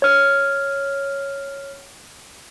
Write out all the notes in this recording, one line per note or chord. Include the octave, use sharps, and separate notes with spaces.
C#5 F6